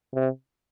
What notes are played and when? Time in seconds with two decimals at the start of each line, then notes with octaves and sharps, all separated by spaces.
0.15 C3